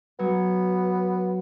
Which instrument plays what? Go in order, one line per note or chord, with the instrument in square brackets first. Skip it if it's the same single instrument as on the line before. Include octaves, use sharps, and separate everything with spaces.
[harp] F#3 [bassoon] B3